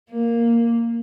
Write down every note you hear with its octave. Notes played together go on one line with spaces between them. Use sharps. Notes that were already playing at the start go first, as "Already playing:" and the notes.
A#3